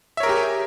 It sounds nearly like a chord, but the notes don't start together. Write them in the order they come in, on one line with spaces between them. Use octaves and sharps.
E5 C#5 A#4 G#4 G4